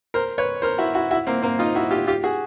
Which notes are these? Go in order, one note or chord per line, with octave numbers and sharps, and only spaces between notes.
A#4 C5
B4 C#5
A#4 C5
E4 F#4
E4 F#4
E4 F#4
A#3 C4
A#3 C4
D#4 F4
E4 F#4
F4 G4
F4 G4
F#4 G#4